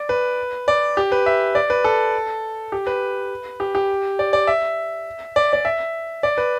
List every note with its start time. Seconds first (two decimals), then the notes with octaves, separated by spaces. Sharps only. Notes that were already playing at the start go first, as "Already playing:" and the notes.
Already playing: D5
0.09 B4
0.68 D5
0.97 G4
1.12 B4
1.26 E5
1.55 D5
1.70 B4
1.84 A4
2.72 G4
2.87 B4
3.60 G4
3.75 G4
4.19 D5
4.33 D5
4.47 E5
5.36 D5
5.53 D5
5.65 E5
6.23 D5
6.38 B4